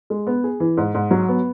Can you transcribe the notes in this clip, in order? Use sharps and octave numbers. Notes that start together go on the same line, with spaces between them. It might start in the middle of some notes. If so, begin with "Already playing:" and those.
G#3
B3
G#4
E3
G#2
G#2
F#3
B3